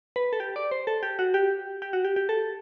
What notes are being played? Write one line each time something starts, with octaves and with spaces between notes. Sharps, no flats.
B4
A4
G4
D5
C5
A4
G4
F#4
G4
G4
F#4
G4
G4
A4